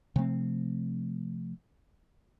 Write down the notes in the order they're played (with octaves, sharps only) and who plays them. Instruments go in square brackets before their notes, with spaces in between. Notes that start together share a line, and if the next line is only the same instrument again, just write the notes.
[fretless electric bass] C3 F3 A3 C4